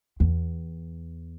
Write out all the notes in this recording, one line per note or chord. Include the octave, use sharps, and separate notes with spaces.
E2